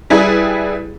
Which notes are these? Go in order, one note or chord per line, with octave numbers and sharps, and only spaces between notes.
G3 E4 G#4 B4